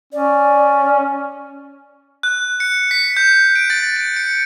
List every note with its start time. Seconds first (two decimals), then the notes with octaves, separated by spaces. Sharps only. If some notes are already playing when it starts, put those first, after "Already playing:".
0.13 C#4 D5
2.23 F#6
2.60 C#7
2.91 B6
3.17 G6
3.56 D7
3.70 A6
3.96 D7
4.16 C#7